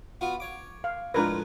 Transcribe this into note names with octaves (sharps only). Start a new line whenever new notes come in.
B3 F4 F#4
C#5 D6
F5
A2 F3 G#3 D4 A#4 B4